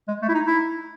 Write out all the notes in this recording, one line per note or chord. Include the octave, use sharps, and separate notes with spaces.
G#3
A3
E4
D#4
E4